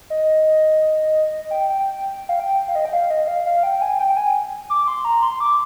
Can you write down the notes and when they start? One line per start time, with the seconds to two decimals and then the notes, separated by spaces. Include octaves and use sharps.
0.10 D#5
1.51 G5
1.69 G5
2.29 F5
2.40 G5
2.68 F5
2.75 D#5
2.85 G5
2.93 F5
3.10 D#5
3.28 F5
3.46 F5
3.63 G5
3.82 G#5
3.99 G5
4.17 G#5
4.70 D6
4.88 C6
5.05 A#5
5.22 C6
5.40 D6